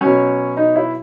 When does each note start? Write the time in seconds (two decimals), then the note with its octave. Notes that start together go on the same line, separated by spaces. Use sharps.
0.01 B2 F#3 C#4
0.57 D#4
0.76 E4